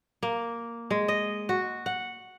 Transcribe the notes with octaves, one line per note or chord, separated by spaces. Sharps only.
A#3
G#3
D#5
F#4
F#5